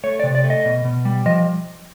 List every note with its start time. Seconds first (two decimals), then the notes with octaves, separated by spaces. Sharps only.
0.04 A3 C#5
0.20 D5
0.23 C3
0.35 D5
0.44 A3
0.50 D#5
0.65 B2
0.85 B2
1.05 G3
1.26 F3 D#5